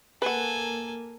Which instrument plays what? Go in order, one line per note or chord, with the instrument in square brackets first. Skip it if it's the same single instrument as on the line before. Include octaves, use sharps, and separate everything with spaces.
[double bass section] A#3 [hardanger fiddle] A4 G#5 [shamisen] B4 F#5